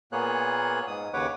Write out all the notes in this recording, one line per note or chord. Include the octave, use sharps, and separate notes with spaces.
A#2 A#3 B3 G#4 C#5 F#6
G#2 D#6
D#2 C#3 B4 C#5 F#5 D6